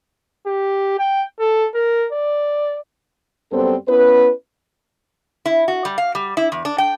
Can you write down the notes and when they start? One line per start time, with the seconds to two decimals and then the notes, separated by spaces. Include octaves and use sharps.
0.46 G4
0.99 G5
1.40 A4
1.74 A#4
2.12 D5
3.52 F#2 G3 B3 C4 A4 C5
3.88 B3 C#4 E4 B4
5.46 E4
5.68 F#4
5.85 G3
5.98 F5
6.15 G3
6.37 E4
6.52 E2
6.65 D4
6.78 G5